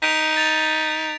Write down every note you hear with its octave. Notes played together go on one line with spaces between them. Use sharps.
D#4 B6 D7 F7
A6 F7